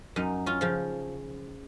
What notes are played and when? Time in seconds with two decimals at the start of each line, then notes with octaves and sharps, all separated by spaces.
0.16 F#2 D#4
0.46 C#4 F4
0.61 C#3 F3